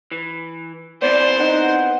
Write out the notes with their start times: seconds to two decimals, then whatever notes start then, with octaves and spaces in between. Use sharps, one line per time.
0.11 E3
1.02 B3 C4 E4 C5 D5
1.40 D#4 F#5